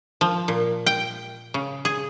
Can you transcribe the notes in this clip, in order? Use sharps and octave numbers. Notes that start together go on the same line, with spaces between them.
F3
A#2
G5
C#3
G#4